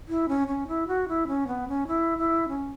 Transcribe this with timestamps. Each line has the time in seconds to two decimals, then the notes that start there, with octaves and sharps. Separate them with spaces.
0.08 E4
0.29 C#4
0.48 C#4
0.68 E4
0.88 F#4
1.08 E4
1.28 C#4
1.47 B3
1.68 C#4
1.88 E4
2.18 E4
2.48 C#4